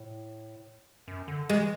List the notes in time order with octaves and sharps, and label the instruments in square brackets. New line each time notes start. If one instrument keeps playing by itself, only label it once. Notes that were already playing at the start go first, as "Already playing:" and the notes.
Already playing: [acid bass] A2
F#2
D3
[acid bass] E3 [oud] G#3